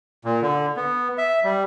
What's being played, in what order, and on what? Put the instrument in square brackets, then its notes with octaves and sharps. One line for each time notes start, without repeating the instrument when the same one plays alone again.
[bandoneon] A#2
D3
B3
E5
G3